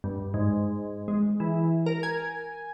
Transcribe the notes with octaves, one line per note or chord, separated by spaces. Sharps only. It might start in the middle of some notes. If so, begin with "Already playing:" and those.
G2
G#2
G#3
E3
A#4
G#5